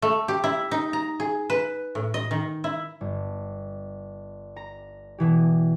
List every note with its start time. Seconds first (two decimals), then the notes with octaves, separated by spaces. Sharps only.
0.02 A3
0.28 G4
0.44 E4
0.71 D#4
0.93 A#5
1.20 G#4
1.50 B4
1.95 A2
2.14 D#5
2.31 D#3
2.64 E4
3.01 G1
4.56 A#5
5.18 B2 E3 G4